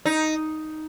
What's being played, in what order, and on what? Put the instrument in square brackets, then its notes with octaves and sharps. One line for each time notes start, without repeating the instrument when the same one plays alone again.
[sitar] D#4